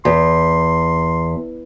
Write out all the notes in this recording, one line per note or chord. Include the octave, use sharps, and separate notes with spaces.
E2 C6